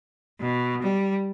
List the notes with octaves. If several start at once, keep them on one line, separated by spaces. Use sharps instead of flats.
B2
G3